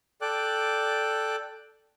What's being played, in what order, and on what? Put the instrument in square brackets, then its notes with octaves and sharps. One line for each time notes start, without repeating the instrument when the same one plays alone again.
[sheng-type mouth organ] A4 D5 G5 D6 F#6